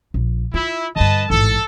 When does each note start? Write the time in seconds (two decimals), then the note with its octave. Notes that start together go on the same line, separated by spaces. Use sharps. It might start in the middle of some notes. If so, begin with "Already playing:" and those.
0.14 A#1
0.54 E4 F4
0.96 G2 D3 B4 D#5 A5
1.30 A1 G#2 A4